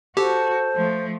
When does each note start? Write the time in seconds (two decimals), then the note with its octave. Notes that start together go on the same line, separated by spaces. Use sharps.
0.17 F#4 G4 A4 C5
0.75 F3 A3